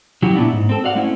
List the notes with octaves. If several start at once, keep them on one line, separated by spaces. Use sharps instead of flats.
C#3 F#3 E4 F#4 G4
A#2 B3 D4 E4
G#2
C4 A4
F#4 D5 F5 F#5
G#3 A3 C4 C#4 E4